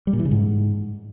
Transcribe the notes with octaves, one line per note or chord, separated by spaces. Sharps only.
G3
A#2
E3
C#3
G#2